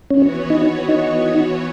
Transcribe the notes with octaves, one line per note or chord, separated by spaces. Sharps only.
E3 B3 C#4 F#4 C#5
D#4
D#4